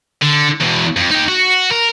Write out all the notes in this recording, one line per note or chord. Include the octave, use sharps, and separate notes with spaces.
D3
E2 B2
F2
D#4 G4
F#4
A#4